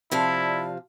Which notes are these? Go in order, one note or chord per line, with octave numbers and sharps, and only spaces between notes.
C3 F3 E4 D5 F5 A5